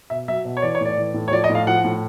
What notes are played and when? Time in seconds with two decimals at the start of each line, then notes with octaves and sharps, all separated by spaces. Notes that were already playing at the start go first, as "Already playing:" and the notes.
0.10 B2 E5
0.28 F#3 E5
0.45 B2
0.57 C#5
0.62 E3 D5
0.75 C#5
0.81 A2 D5
0.98 E3
1.14 A2
1.28 C#5
1.32 F3 D5
1.44 D#5
1.50 A2
1.55 F5
1.67 F3 F#5
1.84 A2